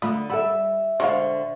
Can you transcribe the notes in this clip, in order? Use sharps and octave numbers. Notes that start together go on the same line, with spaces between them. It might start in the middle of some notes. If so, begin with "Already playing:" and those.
D3 A3 F4 B5 D#6
G3 A4 E5 F#5 B5 E6
B2 D3 G#3 D4 A#4 C5 F5 C#6